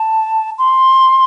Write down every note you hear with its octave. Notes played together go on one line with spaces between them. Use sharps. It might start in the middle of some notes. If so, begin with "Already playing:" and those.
Already playing: A5
C6